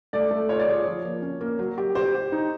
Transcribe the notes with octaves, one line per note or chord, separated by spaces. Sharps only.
A3 D5
A3
F4 C#5
D5
G#4 C#5
F3
A#3
C#4
A#3
F#3
G4
G4 C5
G4
D#4